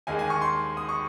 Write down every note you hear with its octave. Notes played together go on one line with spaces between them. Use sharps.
D#2 D#3 G#3 G#5
G#5
C#6
C6
D#6
C#6